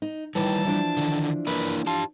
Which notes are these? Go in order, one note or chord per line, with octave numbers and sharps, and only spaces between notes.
D#4
D#3 E3 G3 C#5 A5
E3 F3 D4
D3 D#3
A#3 E4 A#4 B4
F4 G4 A5